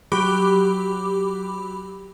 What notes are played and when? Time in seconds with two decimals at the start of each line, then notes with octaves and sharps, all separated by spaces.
0.12 F#3 G4 B5 D6